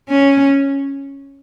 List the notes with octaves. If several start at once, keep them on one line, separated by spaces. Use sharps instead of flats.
C#4